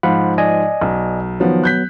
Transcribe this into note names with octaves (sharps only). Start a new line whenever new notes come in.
G#2 F3 F5 F#5 B5
D5 D#5 G#5
B1
D#3 F3 F#3 B3
F#6 G6 B6